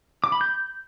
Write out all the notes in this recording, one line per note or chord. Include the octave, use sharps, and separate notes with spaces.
D6
B5
G6